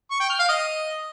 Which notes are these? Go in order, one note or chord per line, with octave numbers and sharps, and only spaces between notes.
C#6
G5
F6
F5
D#5